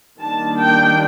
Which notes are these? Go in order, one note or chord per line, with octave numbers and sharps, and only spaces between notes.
D#3 G3 A#3 D4 A5
G5